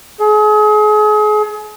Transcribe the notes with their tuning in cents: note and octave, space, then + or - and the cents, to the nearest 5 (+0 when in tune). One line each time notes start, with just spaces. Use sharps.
G#4 +35